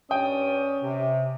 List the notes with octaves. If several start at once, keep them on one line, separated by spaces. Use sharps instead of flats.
G2 C#4 D5 G5 D#6
C3